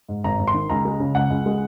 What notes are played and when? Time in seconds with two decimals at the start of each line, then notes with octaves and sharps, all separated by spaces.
0.09 G#2
0.24 G#1 A#5
0.39 G#1
0.48 C6
0.54 D#3
0.70 C#2 A#5
0.85 G#3
1.00 C#3
1.15 C#2 F#5
1.30 C#2
1.46 G#3